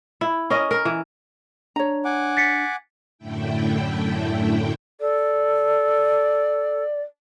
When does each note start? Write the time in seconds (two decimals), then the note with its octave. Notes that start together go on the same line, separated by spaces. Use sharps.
0.21 E4
0.50 C#4 A#4 D#5
0.71 A#4
0.85 E3
1.76 D4 C#5 A#5
2.05 F#5 G#5 D6
2.37 A6 B6 C#7
3.18 F#2 A2 D3 A3 E4 G5
5.00 A4 D5